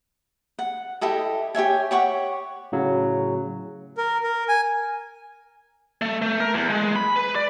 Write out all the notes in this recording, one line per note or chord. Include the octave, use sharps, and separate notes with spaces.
F#5
E4 G4 A4 D#5
G4 C#5 E5 G#5
G4 C#5 F#5 C#6
A2 C#3 F#3
A#4
A#4
G#5
A3
A3
A#4
E2
G#3
B5
B4
D5